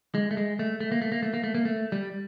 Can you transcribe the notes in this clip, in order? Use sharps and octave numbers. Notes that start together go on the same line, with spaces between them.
G#3
A3
G#3
A3
A3
A#3
A3
A#3
A3
A#3
A3
A#3
A3
G3